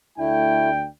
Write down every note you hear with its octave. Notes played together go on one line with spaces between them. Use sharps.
D2 A3 D4 E4 G5